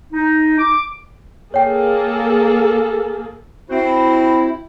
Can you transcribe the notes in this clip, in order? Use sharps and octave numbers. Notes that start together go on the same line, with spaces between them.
D#4
D6
A#3 G#4 A4 C#5 G5
C4 E4 F#4 C5